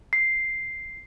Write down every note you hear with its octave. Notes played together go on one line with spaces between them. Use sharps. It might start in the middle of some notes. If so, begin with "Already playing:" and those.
C7